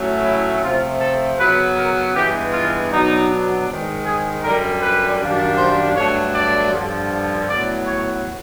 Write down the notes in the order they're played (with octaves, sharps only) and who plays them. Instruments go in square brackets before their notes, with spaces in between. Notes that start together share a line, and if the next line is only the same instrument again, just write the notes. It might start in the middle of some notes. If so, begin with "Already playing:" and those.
Already playing: [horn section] A2 F#3 A3 C#4
E4
C3 F3 A3 F4
A4
C#3 F#3 B3 B4
A#4
G2 E3 G#3 B3 G4
F4
B2 F#3 B3 D4 D#4
G#2 D#3 G#3
G#4
F#2 D3 G3 A#4
B4
F#2 D#3 G3 A#3 D4
C5
G2 D3 F#3 A3 D4 C#5
D5
G2 D3 F3
A2 F#3 B3 D5
C#5